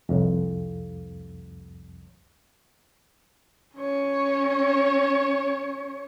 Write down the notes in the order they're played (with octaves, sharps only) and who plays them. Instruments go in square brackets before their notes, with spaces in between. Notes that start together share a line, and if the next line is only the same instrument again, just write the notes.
[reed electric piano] C2 F2
[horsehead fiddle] C#4 C#5